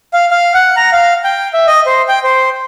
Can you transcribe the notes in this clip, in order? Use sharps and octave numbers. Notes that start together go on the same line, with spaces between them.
F5
F5
F#5
A#5
F5
G5
E5
D#5
C5
G5
C5